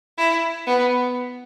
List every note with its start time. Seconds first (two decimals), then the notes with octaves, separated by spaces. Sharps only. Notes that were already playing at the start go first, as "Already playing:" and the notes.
0.18 E4
0.67 B3